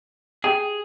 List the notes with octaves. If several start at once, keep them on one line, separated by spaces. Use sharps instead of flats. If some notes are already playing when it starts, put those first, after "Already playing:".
G4 G#4